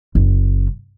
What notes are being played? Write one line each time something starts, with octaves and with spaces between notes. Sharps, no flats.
F#1